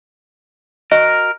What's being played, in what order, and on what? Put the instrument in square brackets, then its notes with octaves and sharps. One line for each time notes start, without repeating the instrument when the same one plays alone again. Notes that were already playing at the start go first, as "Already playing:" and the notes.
[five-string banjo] F#4 D#5 [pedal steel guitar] A#4